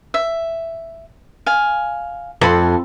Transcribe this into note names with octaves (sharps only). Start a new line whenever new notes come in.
E5
F5 G#5
F2 A4 B5 C6